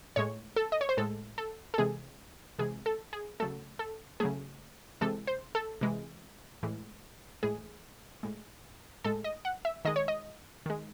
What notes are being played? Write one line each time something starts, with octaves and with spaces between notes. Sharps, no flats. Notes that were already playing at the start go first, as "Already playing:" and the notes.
A2 G#3 C#5
A4
D#5
C#5
C5
A2 G#3 A4
A4
A4
C3 E3 G#3 G#4
C3 E3 G#3 G#4
A4
G#4
C#3 F#3 A3 A4
A4
C#3 F#3 A3 G#4
C3 E3 G#3 A4
C5
A4
C3 E3 G#3
A2 E3 G#3
A2 E3 G#3 G#4
A2 G#3
A2 G#3 A4
D#5
F#5
E5
D#3 G#3 D#5
C#5
D#5
D#3 G#3